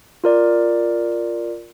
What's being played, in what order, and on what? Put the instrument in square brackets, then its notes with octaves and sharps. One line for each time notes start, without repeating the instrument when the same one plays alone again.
[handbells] F4 A#4 D5